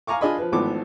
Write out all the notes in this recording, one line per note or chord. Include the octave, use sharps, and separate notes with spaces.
F5 G#5 A#5 C#6 D6
D4 F4 G#4 D#5 G#5 B5
F3 B4
G#1 E3 F3 A3 B3 D6